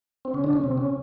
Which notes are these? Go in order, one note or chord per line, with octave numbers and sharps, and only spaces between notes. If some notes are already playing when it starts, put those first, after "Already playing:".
C4
C#3 C#4
D3 D4
C#3 C#4
C3 C4
C#3 C#4